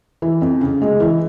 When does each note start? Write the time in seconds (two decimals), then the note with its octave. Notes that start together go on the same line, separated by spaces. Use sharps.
0.22 E3
0.42 F2
0.61 C#3
0.82 G#3
1.00 E3